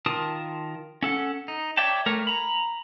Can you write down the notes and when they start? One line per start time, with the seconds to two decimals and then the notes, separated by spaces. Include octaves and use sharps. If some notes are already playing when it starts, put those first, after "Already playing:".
0.06 D#3 F4 A#4 A5 D#6
1.03 C#4 A4 F#5
1.48 D#4
1.77 C#5 D5 E5 G5 A5
2.06 A3 A#4 C#5
2.27 A#5 B5